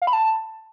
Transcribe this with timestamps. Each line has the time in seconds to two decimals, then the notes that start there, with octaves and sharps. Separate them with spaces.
0.02 F5
0.07 B5
0.13 A5